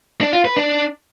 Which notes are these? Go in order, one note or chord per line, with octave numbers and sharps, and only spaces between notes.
D4
F4
B4
D4